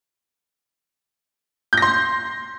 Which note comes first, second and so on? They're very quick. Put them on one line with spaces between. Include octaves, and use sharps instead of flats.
G6 A#6 C6